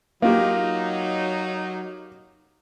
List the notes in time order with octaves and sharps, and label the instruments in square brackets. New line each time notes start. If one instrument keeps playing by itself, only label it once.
[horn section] F#3 D#4 [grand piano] A#3 F4 G4